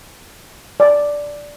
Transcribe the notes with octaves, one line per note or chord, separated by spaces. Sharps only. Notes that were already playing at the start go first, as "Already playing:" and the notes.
D5